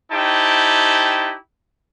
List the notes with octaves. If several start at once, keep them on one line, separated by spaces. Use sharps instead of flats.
D#4 E4 G4 C5 G5 A5